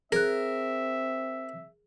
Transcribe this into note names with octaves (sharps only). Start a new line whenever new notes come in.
C4 G#4 A#4 E5 F#6